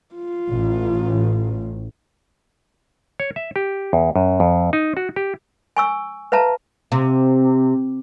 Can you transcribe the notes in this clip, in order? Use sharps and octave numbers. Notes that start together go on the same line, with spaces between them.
F4
A1
C#5
E5
G4
E2
F#2
F2
D#4
F#4
G4
G#5 C#6 E6
B4 E5 F5 A5 A#5
C3